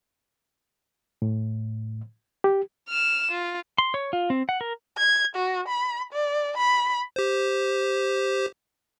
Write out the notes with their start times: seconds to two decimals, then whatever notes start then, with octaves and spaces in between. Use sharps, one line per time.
1.22 A2
2.44 G4
2.89 F6 E7
3.31 F4
3.78 C6
3.94 C#5
4.13 F4
4.30 C4
4.49 F#5
4.61 A#4
4.97 G#6
5.35 F#4
5.68 B5
6.13 D5
6.57 B5
7.16 G4 C5